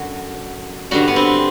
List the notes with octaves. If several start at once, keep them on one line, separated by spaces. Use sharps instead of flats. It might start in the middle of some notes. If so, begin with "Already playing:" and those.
Already playing: F#2 D3 F#4
G2 D3 G3 F#4
B3
C4